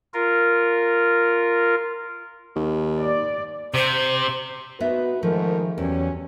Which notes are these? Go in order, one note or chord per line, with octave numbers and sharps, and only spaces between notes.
F4 A#4
D#2
D5
C3 C5
B3 D#4 F#4 B4 E5
G#2 D#3 F3 A3 A#4
E2 F#3 G3 C#4